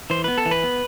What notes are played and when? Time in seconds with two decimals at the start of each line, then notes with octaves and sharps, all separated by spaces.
0.10 E3 C5
0.24 B3 B4
0.38 A4
0.46 E3
0.51 B4
0.63 B3